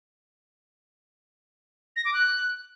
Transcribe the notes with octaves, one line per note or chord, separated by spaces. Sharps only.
A#6
D6
F#6